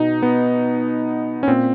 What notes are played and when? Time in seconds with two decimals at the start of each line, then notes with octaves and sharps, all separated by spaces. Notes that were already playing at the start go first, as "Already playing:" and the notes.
Already playing: B2 D#4
0.22 B3
1.43 C#4
1.48 A#2 C4